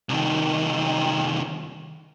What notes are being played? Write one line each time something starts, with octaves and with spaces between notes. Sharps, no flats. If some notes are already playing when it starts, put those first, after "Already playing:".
C2 D#3